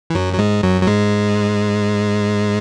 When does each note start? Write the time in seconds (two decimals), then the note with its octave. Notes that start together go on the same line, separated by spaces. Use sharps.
0.10 E3
0.15 F#2 F#3
0.33 F#3
0.39 G#2 G#3
0.63 F#2 F#3
0.82 F#3
0.87 G#2 G#3